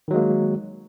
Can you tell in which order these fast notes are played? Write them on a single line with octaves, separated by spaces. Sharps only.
D#3 F#3 G#3 A#3